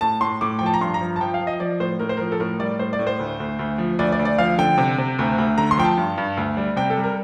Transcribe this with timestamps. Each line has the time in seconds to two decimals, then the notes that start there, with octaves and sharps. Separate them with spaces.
0.01 A2 A5
0.21 A2 C6
0.41 A2 D6
0.59 F3 G5
0.66 A5
0.74 A#5
0.81 G2 C6
0.94 A#5
1.01 F3
1.16 A5
1.21 F3 G5
1.34 F5
1.41 F3
1.47 D#5
1.60 F3 D5
1.80 A2 C5
1.99 A2 A#4
2.09 C5
2.17 F3 A#4
2.32 A4
2.40 A2 A#4
2.60 G3 D5
2.79 A2 C5
2.93 D5
2.99 A2
3.07 C5
3.19 D2
3.40 D2
3.59 D2
3.78 F3
3.99 D2 D5
4.12 D5
4.19 D2
4.25 D5
4.38 F3 F5
4.58 D3 G5
4.78 C3
4.98 C3
5.19 D2
5.38 D2
5.58 D3 A#5
5.71 C6
5.78 F3 G5
5.84 A5
5.97 G2
6.18 G2
6.37 D2
6.57 G3
6.76 C3 G5
6.90 A4
6.97 G3
7.04 A#4